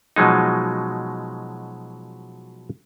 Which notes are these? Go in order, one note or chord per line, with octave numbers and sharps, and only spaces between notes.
B2 F3 F#3 G#3 D#4